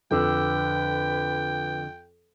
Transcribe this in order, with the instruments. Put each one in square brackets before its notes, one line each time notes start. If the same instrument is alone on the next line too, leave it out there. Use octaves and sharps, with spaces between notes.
[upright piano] F2 [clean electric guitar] D3 [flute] B4 [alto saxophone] G5